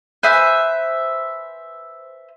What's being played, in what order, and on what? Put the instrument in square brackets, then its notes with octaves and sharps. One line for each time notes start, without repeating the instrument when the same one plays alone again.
[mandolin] B4 C5 E5 G#5